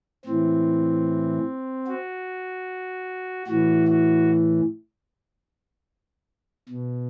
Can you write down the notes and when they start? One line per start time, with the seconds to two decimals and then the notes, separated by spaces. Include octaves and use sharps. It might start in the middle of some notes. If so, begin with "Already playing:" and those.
0.25 A2 E3 C4
1.87 F#4
3.47 A2 E3 F#4
3.88 F#4
6.69 B2